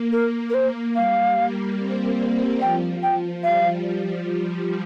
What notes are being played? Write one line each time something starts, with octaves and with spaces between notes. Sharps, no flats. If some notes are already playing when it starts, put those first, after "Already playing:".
Already playing: A#3
A#4
A#4
C5
G3 F5
A#3
C4
G3
F3 G5
G5
G3 F5